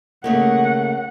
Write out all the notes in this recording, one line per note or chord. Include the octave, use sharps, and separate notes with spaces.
C#3 A3 A#3 F#5